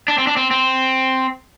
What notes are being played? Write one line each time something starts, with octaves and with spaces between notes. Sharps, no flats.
D4
C4
D4
C4
C4